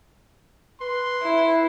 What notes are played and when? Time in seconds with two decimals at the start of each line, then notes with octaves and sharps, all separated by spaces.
0.81 B4 C6
1.22 E4